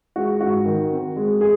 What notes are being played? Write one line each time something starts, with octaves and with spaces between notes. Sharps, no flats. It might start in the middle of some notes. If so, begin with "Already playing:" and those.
G#3 F#4
G#2 F#4
D#3
C4
G#3
G#4